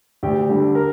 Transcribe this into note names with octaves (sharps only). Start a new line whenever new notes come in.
D2 G4
D3 G3
A#4